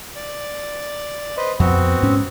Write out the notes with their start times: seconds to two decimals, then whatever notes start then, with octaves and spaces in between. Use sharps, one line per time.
0.16 D5
1.37 B4 C5 D#5
1.60 F2 B3 C4 F#4
2.02 G#2 C#4